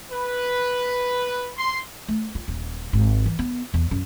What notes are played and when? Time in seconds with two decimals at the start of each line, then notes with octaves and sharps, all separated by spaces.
0.11 B4
1.58 C6
2.09 A3
2.35 F4
2.48 D#1
2.93 G#1
3.26 E3
3.39 B3
3.74 E2
3.91 F#2